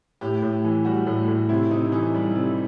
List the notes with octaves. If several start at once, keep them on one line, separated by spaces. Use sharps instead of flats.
A2 G4
A2
E3
G3 F#4
A2
A2
C3 E4
C3 D#4
E3 D#4
G3
C3